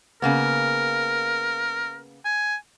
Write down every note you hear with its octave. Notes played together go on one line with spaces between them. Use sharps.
C#3 A#3 B3 A#4
G#5